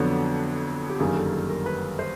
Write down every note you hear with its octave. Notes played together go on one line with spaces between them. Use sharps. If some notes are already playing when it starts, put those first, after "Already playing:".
Already playing: F2 D3 F#3 B3 D4 A4
G4
G1 F#2 D#3 G3 A#3 G#4
A4
A4
A#4
B4
C5